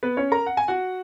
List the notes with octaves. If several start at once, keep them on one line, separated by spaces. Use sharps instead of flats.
B3 B4
C#4 C#5
A#4 A#5
F#5
G#5
F#4 F#5